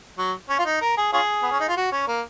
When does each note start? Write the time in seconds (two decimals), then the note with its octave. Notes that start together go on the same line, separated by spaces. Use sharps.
0.18 F#3
0.50 C#4
0.59 F4
0.65 D#4
0.81 A#4
0.97 G#4
1.13 C#4 F4 G#4
1.43 B3
1.51 C#4
1.60 D#4
1.69 F4
1.77 F#4
1.92 C#4
2.08 A#3